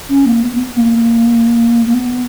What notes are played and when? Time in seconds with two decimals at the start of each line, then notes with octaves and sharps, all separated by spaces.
0.09 C#4
0.26 A#3
0.43 B3
0.59 B3
0.77 A#3
1.86 A#3
1.94 B3